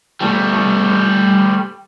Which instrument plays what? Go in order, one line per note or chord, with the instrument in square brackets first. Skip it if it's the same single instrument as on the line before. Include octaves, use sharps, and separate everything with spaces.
[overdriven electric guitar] G3 A3